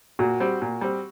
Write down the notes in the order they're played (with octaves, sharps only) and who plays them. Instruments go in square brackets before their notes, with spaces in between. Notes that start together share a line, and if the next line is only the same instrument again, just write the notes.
[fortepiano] A#2 [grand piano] F#4
[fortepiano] G3 C4
A#2
G3 C4